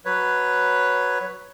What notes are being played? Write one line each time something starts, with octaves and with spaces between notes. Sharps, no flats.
F#3 B4 C#5